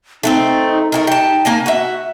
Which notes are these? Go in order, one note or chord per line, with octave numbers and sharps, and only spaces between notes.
A3 B3 C4 D#4
A3 G#4 A#4
G4 A5
A#3 G#5 A5
F#4 E5